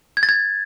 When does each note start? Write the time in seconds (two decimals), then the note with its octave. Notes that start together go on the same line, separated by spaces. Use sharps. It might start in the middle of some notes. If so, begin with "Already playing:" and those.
0.17 G#6
0.23 A6
0.29 G#6